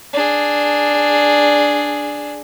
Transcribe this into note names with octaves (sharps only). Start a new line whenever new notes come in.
D4 G#4